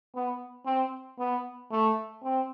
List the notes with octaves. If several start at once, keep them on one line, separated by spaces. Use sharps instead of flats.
B3
C4
B3
A3
C4